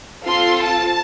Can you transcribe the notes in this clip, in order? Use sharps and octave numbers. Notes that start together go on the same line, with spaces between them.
C4 F4 A4 C6
A5